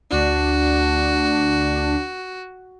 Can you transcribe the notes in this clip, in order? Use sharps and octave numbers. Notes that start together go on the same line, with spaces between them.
D2 D4 F#4